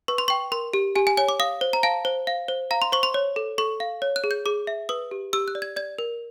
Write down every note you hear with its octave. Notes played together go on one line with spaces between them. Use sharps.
B4 C#6
C6
G5 C#6
A#4 C6
G4
G4 G#5
G#5
C#5 G#5
D6
F5 D#6
C5
A#5
F5 A5
C5
F5
C5
F5 A#5
C6
C5 C#6
C6
C#5
A4
A4 C#6
F5
C#5
F#6
G#4
G6
G#4 D6
E5
B4 D#6
G4
G4 E6
F#6
D5
G#6
D5 G#6
A#4